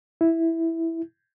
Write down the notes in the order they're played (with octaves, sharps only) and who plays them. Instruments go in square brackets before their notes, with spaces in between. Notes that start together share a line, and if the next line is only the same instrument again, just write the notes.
[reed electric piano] E4